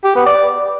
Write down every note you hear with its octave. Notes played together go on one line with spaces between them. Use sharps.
G4
B3
D5